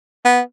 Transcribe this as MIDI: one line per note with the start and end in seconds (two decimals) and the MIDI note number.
0.25 0.40 59